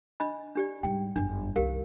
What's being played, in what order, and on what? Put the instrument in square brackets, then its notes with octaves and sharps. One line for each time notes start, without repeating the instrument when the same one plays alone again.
[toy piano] D4 D#5 B5
D4 G4 D5
[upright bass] G#2 G3 [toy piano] G5
[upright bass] G1 F#2 [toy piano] D4
[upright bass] C2 D#3 [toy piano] G4 A#4 F5